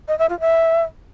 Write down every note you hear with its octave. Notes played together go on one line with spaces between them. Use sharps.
D#5
E5
F4
E5